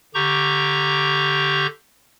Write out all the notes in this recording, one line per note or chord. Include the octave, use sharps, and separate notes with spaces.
D3 G4 A#5 C#6 G6